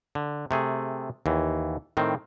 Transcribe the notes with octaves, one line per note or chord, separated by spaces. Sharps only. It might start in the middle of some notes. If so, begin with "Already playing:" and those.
D3
C3 A3 G#4
D#2 E3
A2 D#3 C4